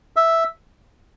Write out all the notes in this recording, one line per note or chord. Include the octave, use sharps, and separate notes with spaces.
E5